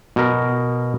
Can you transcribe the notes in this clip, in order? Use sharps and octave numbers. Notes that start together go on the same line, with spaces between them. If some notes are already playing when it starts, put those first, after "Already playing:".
B2 A#4